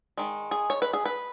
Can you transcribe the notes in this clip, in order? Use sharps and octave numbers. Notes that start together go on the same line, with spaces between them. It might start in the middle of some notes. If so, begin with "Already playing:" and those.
D#3 G#3
G#4
C#5
B4
G#4
B4